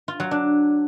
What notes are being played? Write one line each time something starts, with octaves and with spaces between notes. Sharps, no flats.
F4
F#3
D4